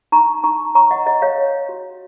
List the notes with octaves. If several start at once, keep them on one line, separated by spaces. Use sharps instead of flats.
D#4 A#5 C#6
D#4 A#5 C#6
C#5 A#5 C#6
D#5 F#5
C#5 D#5
C#5 F5
C#5
F#4